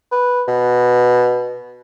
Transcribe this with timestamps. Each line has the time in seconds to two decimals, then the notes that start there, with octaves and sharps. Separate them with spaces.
0.12 B4
0.48 B2